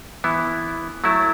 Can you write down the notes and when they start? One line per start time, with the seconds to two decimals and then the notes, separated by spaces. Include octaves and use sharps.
0.24 E3 B3 E4
1.04 F#3 A3 E4